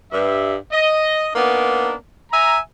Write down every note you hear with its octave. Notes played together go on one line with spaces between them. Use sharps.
G2 E5
D#5
A#3 B3 D4 D#4
E5 G#5 A#5